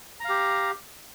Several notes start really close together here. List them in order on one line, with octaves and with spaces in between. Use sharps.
A#5 F5 G4